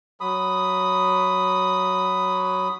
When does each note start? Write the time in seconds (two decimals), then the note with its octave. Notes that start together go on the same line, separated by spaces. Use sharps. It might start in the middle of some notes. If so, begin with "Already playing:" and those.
0.21 F#3 B5 D#6